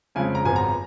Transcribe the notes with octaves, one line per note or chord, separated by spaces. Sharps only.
F2 C#3 F3 G#3 G#5
A#5
G#1 F#2 F3 B3 G#5
A#5